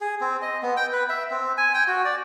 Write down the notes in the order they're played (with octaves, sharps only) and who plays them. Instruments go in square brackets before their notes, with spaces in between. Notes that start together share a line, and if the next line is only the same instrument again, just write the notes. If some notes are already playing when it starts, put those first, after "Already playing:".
[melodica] G#4
C4
D#5
B3
G5
B4
E5
C4
G#5
G5
F#4
D5